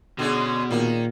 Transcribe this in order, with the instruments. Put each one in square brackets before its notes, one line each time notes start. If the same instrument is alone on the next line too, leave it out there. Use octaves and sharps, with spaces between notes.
[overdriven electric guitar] B2 [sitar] D3 G#3 C#4
[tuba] A#2 [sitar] D#3 A#3